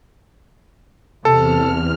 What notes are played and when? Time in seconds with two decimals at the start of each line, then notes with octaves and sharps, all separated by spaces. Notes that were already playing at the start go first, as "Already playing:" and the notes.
1.25 E2 C3 A4 A5 F6